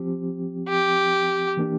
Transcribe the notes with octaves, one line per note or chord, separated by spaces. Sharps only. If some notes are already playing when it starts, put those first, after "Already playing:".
Already playing: F3 C4 G4
G4
E3 A#3 D4 G4